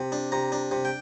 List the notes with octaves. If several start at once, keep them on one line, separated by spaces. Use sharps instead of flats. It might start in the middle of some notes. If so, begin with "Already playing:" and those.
Already playing: C3
D4
C3 A#5
D4
C3
G5